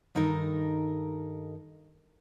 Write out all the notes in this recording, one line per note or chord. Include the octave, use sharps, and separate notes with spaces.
G2 D#3 D#4 A4 A#4 D#5